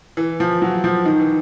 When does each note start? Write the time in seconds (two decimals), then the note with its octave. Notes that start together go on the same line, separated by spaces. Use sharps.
0.17 E3
0.40 F3
0.62 F#3
0.84 F3
1.06 D#3
1.20 E3